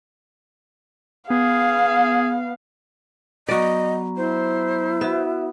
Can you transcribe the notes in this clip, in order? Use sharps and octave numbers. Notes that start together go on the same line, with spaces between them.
B3 G#4 F5
F#3 B3 F#4 D5 D#5 A#5
E4 C5
B3 F#4 E5